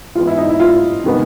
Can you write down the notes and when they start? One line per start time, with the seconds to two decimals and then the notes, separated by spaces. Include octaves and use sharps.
0.15 E3 G#3 B3 F4
0.27 E4
0.38 D#4
0.49 E4
0.60 F4
1.04 C3 D#3 G#3 B3